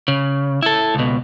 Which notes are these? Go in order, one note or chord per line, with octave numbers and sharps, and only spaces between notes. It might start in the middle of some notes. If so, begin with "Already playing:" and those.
C#3
E4 A4
C#2 B2